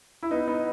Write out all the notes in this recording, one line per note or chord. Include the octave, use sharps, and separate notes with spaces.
E4
B3 D#4
B3 D#4